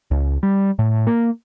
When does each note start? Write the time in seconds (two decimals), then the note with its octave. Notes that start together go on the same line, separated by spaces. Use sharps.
0.11 C#2
0.43 G3
0.79 A2
1.07 A#3